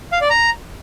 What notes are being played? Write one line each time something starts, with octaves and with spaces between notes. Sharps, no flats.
F5
D5
A#5